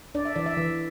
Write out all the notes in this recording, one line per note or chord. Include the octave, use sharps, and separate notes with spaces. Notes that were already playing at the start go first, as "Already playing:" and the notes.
D4 D5
E5
E3 D5
E5
E3